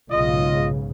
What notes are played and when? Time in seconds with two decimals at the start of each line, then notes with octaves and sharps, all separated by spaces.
0.11 B1 G#2 C#3 F4 D#5